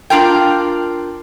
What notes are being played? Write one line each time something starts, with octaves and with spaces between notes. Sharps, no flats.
D4 F4 A#4 G5